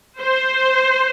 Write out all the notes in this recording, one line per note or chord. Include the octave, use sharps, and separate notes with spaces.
C5